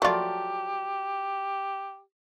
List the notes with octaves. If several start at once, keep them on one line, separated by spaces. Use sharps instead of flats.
F3 F#3 A3 F4 G4 D5